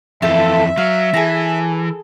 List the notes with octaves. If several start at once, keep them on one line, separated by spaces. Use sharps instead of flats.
F2 E3 A3 F4 A4 E5
F#3 F5
E3 G#4 A4 A#5